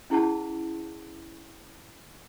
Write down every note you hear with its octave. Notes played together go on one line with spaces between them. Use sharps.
C#4 E4 G#4 F#5 A5